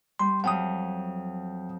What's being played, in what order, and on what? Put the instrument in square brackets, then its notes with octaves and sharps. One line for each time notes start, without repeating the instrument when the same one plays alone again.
[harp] G3 [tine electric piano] C6
[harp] F2 F#3 [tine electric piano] F#5 G5 D#6